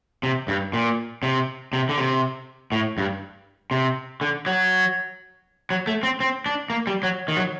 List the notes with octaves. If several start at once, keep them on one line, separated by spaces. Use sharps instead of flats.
C3
G2
A#2
C3
C3
D3
C3
A2
G2
C3
D3
F#3
F#3
A3
C4
C4
D4
A#3
G3
F#3
D#3
F#3